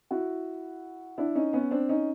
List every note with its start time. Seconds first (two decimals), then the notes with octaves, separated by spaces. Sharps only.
0.11 E4 F#4
1.18 D4 E4
1.35 C#4 D#4
1.53 B3 C#4
1.71 C4 D4
1.89 C#4 D#4